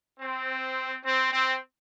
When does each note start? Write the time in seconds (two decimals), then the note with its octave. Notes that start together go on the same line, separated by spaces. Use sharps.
0.19 C4
1.03 C4
1.31 C4